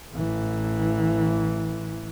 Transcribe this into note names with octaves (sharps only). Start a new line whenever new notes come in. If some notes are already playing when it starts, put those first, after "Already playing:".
A1 E3